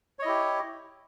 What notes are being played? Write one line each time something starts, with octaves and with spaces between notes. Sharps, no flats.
E4 G4 C#5 D#5